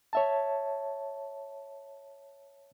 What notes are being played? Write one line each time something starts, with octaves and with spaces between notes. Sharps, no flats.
C#5 E5 A5